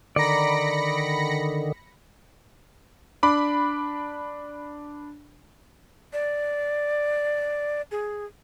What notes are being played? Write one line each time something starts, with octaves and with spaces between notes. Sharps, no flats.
D3 D#3 D5 A#5 B5 A#6 C#7
D4 B5 D6
D5
G#4